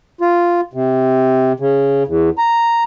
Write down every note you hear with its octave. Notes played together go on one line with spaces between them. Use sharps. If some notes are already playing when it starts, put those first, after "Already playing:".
F4
C3
C#3
E2
A#5